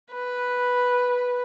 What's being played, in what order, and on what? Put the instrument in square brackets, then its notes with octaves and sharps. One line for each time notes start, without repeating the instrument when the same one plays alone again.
[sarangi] B4